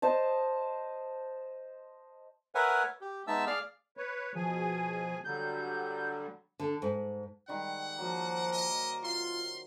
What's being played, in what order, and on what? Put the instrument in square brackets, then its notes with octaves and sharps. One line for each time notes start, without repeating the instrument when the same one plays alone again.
[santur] C5 D#5 A5
[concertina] A#4 B4 C#5 E5 F#5 G#5
G4
G#3 B3 D#4 E5 A5 E6
G#4 D5 F5 F6
[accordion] B4 C#5
[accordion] B2 G#4 G#5 [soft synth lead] F3
[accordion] D3 F#3 G3 [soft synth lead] G6
[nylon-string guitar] D3
G#2
[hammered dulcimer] D#3 G3 G#3 [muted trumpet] F#5
[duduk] F3 [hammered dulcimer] F#3 C5 [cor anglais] A#3
[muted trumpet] D#5
[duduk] F4 [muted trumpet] C6